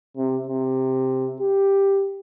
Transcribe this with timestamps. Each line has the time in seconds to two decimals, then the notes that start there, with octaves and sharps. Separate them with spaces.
0.17 C3
0.47 C3
1.40 G4